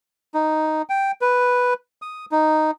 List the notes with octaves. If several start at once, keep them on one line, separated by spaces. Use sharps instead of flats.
D#4
G5
B4
D#6
D#4